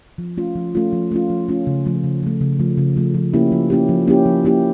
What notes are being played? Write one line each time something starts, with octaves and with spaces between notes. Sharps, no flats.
F3
A3 C#4 F4
F3
A3 C#4 F4
F3
A3 C#4 F4
F3
A3 C#4 F4
C#3
F3 A3
C#3
F3 A3
C#3
F3 A3
C#3
F3 A3
F3
A#3 C#4 E4 G4
F3
A#3 C#4 E4 G4
F3
A#3 C#4 E4 G4
F3
A#3 C#4 E4 G4